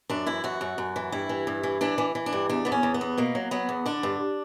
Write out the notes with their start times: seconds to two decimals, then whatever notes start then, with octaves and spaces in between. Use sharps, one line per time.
0.09 F#2 D4
0.26 E3 E4
0.44 F#2 F#4
0.61 F#2
0.78 F#2
0.96 E3
1.12 G2 E4
1.29 E3
1.47 G2
1.63 E3
1.81 E3 D4
1.98 E3
2.15 E3
2.26 D4
2.32 G2
2.49 E2 D4
2.65 E2 B3
2.72 C#4
2.83 E2
2.94 B3
3.01 E2
3.18 B2 A#3
3.35 F#3
3.51 F#3 B3
3.69 E2
3.86 D3 D4
4.03 G2